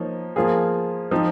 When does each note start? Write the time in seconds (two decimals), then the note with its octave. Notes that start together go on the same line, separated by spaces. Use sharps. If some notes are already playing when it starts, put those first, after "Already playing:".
Already playing: F3 A#3 D#4 C#5
0.36 F3 A#3 F4 G#4
1.11 F3 C4 D#4